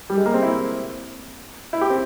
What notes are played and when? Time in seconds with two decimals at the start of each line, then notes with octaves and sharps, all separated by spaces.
0.10 G3
0.17 G#3
0.26 A#3
0.34 C4
0.42 E4
1.73 E4
1.81 G4
1.90 C4